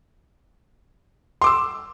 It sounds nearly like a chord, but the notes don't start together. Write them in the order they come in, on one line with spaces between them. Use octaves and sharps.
C6 D6 E6